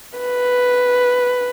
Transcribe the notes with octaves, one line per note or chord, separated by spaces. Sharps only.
B4